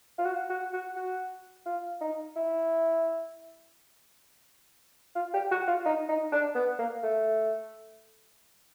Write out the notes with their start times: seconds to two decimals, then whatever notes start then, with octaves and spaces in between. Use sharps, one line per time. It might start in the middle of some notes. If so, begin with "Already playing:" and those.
0.19 F4
0.25 F#4
0.50 F#4
0.73 F#4
0.96 F#4
1.66 F4
2.01 D#4
2.36 E4
5.16 F4
5.34 G4
5.51 F#4
5.68 F4
5.86 D#4
6.09 D#4
6.32 D4
6.55 B3
6.79 A#3
7.03 A3